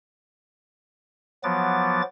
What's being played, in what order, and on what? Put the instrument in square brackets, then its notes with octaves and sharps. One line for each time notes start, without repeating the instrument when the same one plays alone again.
[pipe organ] F3 F#3 B3 D6 A6